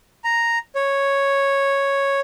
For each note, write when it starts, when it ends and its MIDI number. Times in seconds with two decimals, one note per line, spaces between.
0.24 0.59 82
0.76 2.20 73